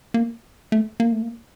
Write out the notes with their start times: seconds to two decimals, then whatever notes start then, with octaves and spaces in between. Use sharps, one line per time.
0.14 A#3
0.72 A3
1.00 A#3
1.12 A3
1.22 A#3